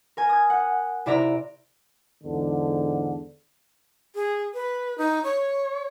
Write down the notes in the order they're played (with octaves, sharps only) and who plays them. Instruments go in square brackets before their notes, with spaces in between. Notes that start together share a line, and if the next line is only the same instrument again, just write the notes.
[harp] A#4 G#5
D#6 G#6
F#5
C3 E4 D5 E5 A#5 D7
[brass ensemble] E2 G#2 D3
[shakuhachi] G#4
B4
D#4
C#5